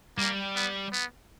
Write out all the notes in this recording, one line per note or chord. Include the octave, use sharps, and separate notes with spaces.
G3 A#3
B3
B3